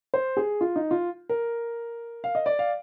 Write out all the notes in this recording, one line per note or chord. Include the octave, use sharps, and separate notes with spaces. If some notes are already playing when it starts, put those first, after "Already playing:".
C5
G#4
F4
D#4
F4
A#4
F5
D#5
D5
F5